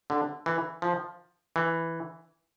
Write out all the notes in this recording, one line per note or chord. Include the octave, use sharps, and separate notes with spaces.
D3
E3
F3
E3